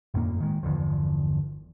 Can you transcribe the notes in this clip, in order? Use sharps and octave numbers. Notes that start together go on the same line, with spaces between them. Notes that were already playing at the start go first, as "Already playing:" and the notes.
G1 F2 A2 A#3
D#3 G#3
G1 E2 D3 F3